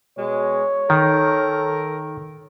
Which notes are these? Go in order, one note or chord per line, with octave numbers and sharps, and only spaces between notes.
B2 G#3 C#5
D#3 A4 A#4